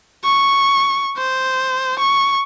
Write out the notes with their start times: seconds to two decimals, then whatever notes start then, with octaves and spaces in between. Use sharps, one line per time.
0.24 C#6
1.17 C5
1.99 C#6